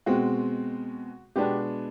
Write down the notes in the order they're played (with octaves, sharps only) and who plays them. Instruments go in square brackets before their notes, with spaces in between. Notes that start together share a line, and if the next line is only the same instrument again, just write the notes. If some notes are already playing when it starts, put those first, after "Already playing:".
[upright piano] B2 G#3 C4 F#4
B2 G#3 B3 D4 G4